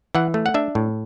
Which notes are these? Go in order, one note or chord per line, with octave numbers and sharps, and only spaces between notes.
E3 F#5
A3
F#5
D4 E5
A2